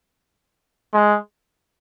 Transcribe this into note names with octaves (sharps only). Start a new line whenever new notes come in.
G#3